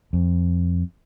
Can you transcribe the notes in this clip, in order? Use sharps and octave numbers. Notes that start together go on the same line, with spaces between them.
F2